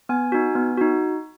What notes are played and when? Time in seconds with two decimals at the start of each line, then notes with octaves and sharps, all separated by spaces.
0.09 B3 G#5
0.32 D#4 F#4
0.55 B3
0.77 D#4 F#4